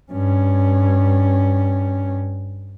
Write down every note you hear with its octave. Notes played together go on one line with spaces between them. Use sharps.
G2 C#4